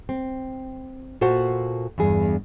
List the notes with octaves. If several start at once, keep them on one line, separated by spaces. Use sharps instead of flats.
C4
A#2 F#4 A4 C5 F#5
E2 G2 G#4